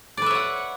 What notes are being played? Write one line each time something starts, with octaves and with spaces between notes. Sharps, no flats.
B4 C#5 D5 E5 F#5